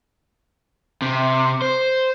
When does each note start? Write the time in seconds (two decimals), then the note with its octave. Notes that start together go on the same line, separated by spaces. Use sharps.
1.02 C3
1.62 C5